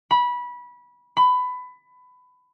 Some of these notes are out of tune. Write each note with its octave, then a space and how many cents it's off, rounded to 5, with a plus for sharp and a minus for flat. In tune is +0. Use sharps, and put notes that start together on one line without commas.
B5 -20
B5 +20